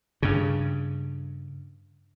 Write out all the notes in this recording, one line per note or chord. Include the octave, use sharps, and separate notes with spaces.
G2 C#3